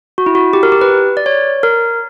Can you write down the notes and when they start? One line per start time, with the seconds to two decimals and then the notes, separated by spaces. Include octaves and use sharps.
0.18 F#4
0.26 E4
0.35 F#4
0.53 G4
0.63 A#4
0.72 G4
0.81 B4
1.17 D5
1.26 C#5
1.63 A#4